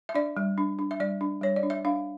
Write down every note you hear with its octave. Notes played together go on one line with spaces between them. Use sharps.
E5
D4 D5
G3
D4
D4
E5
G3 D5
D4
G3 C#5
D5
D4
E5
D4 F5